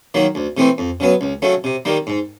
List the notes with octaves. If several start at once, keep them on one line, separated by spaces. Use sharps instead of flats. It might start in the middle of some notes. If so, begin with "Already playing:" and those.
D#3 F#3 A#3
D2
C3 E3 A3 C4
F2
C#3 F#3 B3
C#2
C#3 F#3 A3
C3
D#3 G3 A#3
G#2